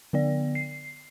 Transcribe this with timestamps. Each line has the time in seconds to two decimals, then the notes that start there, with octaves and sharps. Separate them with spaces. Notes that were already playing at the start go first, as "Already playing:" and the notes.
0.13 D3 B3 D5
0.55 C7